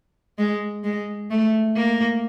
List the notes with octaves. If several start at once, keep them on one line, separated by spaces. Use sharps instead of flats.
G#3
G#3
A3
A#3